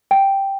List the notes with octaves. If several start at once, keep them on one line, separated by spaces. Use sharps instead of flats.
G5